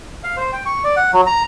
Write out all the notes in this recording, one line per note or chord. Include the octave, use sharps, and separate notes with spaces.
F5
C5
G5
C#6
D5
F#5
F#3
A#5